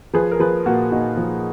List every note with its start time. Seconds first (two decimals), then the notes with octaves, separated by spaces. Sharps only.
0.14 F3 G#4 B4
0.32 A#4
0.40 F3 G#4 B4
0.65 A#2 F#4 A#4
0.92 A#2 D#4 F#4
1.17 F3